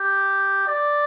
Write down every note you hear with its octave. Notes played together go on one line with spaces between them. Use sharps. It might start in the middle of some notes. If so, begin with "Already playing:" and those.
Already playing: G4
D5